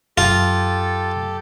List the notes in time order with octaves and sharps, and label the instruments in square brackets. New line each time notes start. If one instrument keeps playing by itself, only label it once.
[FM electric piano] F#2 [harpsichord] F4 [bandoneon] G4 A4